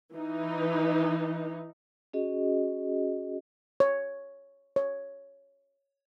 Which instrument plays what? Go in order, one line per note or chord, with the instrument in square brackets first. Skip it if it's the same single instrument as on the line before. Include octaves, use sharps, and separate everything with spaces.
[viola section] E3 D#4
[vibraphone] C#4 F#4 G#4 D#5
[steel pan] C#5
C#5